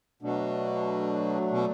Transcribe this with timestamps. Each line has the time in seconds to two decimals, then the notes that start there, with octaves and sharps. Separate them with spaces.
0.22 B2 F#3 A3 D4
1.51 B2